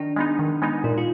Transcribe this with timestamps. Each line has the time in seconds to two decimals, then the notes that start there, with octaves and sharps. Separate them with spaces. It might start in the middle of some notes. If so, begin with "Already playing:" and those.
Already playing: D#3 D4
0.16 G#3 B3 D#4
0.39 D#3
0.62 G#3 B3 D#4
0.84 A#2 D#4
0.98 F4